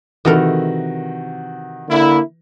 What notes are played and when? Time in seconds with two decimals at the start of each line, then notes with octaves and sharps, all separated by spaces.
0.25 C3 D#3 E3 F#4 A4 A#4
1.89 D3 A#3 E4